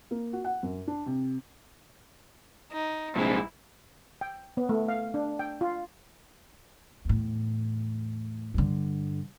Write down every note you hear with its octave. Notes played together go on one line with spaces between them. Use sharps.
A#3
F#4
F#5
F#2
D4
C3
D#4
A#1 G2 C3 G#3 C4 E4
G5
B3
A3
F5
D4
G5
F4
E2 A2
G2 D3